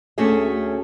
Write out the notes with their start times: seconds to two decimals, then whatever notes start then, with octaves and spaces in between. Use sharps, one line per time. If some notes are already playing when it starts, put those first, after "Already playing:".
0.18 D2 A3 C#4 F#4 G#4 E5